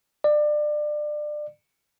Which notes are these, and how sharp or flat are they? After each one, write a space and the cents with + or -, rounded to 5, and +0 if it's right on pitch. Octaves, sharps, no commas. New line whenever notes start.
D5 +25